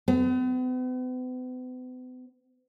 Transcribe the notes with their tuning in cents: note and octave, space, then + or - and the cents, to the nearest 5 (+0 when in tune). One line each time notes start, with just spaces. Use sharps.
B3 +45